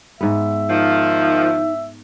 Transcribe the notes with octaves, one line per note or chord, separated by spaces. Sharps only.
G#2 B3 E5
D#3 F3 D#4